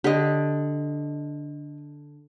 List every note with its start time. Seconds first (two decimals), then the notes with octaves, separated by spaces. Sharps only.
0.04 D3 G4 D#5